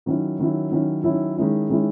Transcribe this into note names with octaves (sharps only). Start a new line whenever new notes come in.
D#3 F#3 C#4 E4
D#3 F#3 C#4 E4
D#3 F#3 C#4 E4
D#3 F#3 C#4 E4
D#3 G#3 C#4 E4
D#3 G#3 C#4 E4